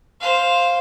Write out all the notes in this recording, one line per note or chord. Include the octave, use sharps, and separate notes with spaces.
C5 F5